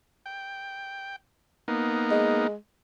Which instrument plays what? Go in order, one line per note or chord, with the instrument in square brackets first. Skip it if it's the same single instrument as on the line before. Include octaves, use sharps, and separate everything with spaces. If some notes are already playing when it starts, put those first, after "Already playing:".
[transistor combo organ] G5
A#3 B3 D#4
[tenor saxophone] G#3